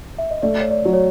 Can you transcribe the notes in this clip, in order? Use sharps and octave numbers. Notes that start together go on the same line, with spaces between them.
E5
D#5
A3 D5
C#5
D5
F#3
C#5